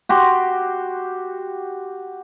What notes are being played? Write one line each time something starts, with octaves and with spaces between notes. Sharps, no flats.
F#4 G4 C6